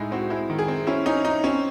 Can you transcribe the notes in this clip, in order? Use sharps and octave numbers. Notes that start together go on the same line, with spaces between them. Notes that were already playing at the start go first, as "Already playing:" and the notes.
Already playing: A2 G#3 D#4 E4
C4 F#4
G#3 E4
D#3
G#4
C4
C#4 E4
C#4 D#4
C#4 D#4
C4 C#4